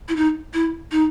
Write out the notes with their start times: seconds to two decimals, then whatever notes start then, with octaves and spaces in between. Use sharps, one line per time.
0.09 E4
0.16 D#4
0.54 E4
0.92 D#4